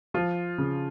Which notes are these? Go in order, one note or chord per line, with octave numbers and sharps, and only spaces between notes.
F3 F4
C#3